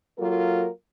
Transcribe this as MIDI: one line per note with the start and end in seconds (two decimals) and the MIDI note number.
0.17 0.66 54
0.17 0.66 58
0.17 0.66 65
0.17 0.66 69
0.17 0.66 70